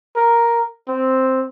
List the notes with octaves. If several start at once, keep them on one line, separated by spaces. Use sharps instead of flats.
A#4
C4